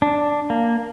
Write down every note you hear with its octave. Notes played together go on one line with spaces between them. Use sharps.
D4
A#3